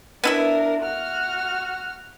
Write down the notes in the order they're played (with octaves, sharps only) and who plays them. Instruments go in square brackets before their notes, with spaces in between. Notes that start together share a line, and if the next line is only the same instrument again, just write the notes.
[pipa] B3 E4 E5 [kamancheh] D4 A#4
[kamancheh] F#4 F6